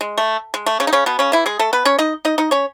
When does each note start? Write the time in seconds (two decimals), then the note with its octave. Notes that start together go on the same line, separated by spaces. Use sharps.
0.01 G#3
0.18 A3
0.54 G#3
0.66 A3
0.80 C#3 C#4
0.87 D#4
0.93 C#3 C#4
1.06 B2 B3
1.19 C#3 C#4
1.32 E3 E4
1.46 G#3 G#4
1.59 A3 A4
1.73 B3 B4
1.85 C#4 C#5
1.99 D#4 D#5
2.25 D#4 D#5
2.38 D#4 D#5
2.51 C#4 C#5